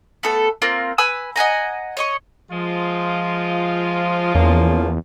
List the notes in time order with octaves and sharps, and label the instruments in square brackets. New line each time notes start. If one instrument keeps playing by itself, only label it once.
[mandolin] A3 B3 A4
A#3 C4 F4 A#4
B4 G#5 E6
D#5 F#5 G#5 A#5
C#5 D#5 C#6
[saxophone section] F3 [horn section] G#3 F4
[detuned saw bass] E2 [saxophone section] F3 A#3 C#4